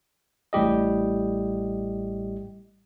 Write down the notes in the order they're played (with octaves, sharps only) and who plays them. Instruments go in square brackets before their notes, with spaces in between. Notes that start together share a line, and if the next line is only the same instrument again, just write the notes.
[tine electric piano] A1 A2 G3 G4 D#5